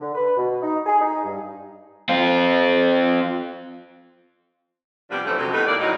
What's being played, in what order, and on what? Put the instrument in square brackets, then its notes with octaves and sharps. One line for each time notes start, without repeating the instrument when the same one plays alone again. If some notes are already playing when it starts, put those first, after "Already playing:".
[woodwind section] D3
B4
B2
D#4
G#4
D#4
G2
[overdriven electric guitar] C4 F4
[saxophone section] C3 F3 G3 B3 D4 G4
F#2 D3 E3 A3 C#4 C5
F2 C3 F#3 A3 D4
A2 G3 A3 B3 D#4 G4
E2 D#3 A#3 C4 D5
A2 F#3 D#4